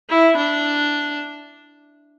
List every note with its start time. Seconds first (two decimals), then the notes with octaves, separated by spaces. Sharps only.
0.09 E4
0.37 D4